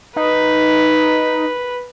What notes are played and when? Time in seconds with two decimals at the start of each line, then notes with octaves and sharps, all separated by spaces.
0.16 D#4 B4